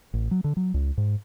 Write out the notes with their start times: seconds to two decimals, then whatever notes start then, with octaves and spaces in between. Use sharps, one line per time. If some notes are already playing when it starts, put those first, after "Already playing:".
0.14 A1
0.31 F#3
0.44 D3
0.57 F#3
0.74 C#2
0.97 G#2